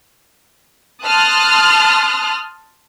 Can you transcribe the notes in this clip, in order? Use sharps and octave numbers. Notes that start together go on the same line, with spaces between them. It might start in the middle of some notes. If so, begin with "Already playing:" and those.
A5 C6 D#6 F6 F#6